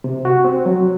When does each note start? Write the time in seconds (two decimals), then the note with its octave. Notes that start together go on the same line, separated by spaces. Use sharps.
0.04 C3
0.25 F#4
0.44 C4
0.66 F#3